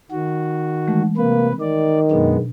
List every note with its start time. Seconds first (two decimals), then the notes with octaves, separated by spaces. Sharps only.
0.11 D#3 F#4
0.88 E3 G#3 A3
1.17 C3 A#3 B4
1.61 D#3 D5
2.11 F#2 B2 G#3 B3 D4